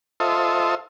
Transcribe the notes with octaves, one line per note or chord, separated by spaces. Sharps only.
F4 A4 C5 D#5 E5